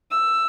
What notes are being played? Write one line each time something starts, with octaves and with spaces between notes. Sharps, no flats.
E6